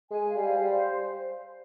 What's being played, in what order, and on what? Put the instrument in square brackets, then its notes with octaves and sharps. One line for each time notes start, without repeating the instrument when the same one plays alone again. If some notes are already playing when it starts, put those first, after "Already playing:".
[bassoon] G#3 [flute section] G#5
[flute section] F5
[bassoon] G3
[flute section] C5
[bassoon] G3
[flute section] C5